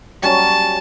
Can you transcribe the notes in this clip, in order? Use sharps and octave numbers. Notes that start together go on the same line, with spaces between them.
F#3 G3 C#4 A5